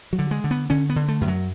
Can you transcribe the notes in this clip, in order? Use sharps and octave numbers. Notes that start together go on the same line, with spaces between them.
F#3
D3
G#3
D3
B3
D3 C#4
B3
D3
A3
F#2
F#3